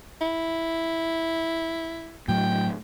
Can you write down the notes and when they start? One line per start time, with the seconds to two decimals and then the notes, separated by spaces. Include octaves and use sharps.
0.21 E4
2.28 A2 F#3 G5